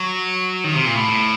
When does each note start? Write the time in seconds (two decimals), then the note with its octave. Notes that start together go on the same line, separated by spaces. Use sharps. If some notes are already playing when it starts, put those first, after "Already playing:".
Already playing: F#3
0.64 D#3
0.74 C3
0.85 A#2
0.95 A2